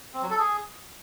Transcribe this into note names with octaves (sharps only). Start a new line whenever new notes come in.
C4
F#3
A4
G#4